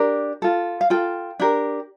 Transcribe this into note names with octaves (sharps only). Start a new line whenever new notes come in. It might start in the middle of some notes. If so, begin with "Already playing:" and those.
Already playing: D4 G4 A#4
F4 A4
F5
F4 A4 G5
D4 G4 A#4